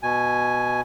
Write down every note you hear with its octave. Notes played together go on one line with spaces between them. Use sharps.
B2 G#5